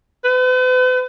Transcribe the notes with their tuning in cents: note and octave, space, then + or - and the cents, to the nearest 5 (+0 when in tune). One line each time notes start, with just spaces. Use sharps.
B4 +45